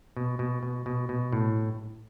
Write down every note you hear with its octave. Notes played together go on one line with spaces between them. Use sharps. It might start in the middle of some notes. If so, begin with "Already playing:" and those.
B2
B2
B2
B2
B2
A2